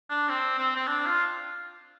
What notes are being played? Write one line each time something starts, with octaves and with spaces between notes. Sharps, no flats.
D4
C4
C4
C4
D4
F4